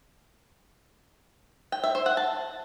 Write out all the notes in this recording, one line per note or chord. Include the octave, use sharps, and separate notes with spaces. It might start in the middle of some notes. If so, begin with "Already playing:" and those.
G5
E5
C5
F#5
A5